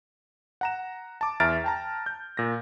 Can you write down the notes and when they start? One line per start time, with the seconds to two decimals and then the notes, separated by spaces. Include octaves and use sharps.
0.61 F#5 A#5 E7
1.21 A5 D6
1.40 E2 E5 A#5 F6 A6 D7
1.64 G5 A5 A#5
2.06 G6
2.37 A#2 A#6